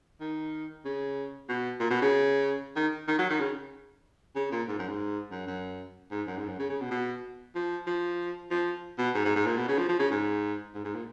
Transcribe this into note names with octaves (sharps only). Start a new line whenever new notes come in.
D#3
C#3
B2
A#2
B2
C#3
D#3
D#3
F#3
D#3
C#3
C#3
A#2
G#2
F#2
G#2
F#2
F#2
G#2
F#2
G#2
F#2
C#3
C#3
B2
B2
F3
F3
F3
B2
G#2
G#2
G#2
A#2
B2
C#3
F3
F3
C#3
G#2
G#2
G#2
A#2